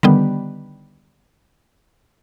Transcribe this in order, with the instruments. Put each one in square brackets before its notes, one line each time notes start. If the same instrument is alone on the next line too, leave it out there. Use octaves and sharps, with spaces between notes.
[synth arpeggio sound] D3 D#3 G3 B3